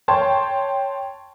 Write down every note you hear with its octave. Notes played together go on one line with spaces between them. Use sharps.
C#5 G5 A5 C6